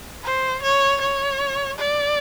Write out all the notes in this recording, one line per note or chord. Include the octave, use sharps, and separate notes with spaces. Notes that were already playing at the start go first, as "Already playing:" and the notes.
C5
C#5
C#5
D5